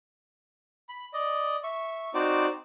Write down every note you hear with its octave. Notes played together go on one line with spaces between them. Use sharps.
B5
D5 D#5
E5 C#6
C4 D#4 F#4 C5 D5 D6